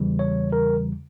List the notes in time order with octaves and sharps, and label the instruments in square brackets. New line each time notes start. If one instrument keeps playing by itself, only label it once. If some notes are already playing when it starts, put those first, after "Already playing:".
Already playing: [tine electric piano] E2 C#3 E3 G3
C#5
A#4